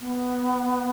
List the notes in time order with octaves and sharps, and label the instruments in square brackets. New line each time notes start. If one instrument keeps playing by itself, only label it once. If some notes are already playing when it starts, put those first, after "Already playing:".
[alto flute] B3